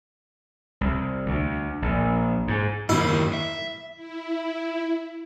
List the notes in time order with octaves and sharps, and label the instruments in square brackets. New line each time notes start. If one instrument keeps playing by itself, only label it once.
[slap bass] C2
D2
A#1
G#2
[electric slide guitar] F#2 D#3 A#3 [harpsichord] E4
[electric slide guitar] E5
[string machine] E4